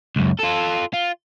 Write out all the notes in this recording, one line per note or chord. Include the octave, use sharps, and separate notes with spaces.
C#2 F#2
F4 A4
F4